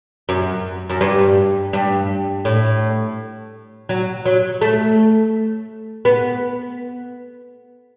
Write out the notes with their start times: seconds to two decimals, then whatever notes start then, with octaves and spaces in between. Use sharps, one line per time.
0.29 F#2
0.90 F#2
1.01 G2
1.73 G2
2.45 A2
3.89 F#3
4.25 F#3
4.61 A3
6.05 B3